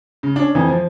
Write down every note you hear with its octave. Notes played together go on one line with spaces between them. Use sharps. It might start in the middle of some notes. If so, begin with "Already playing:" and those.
C#3
C#4 D4
F2 E3
F3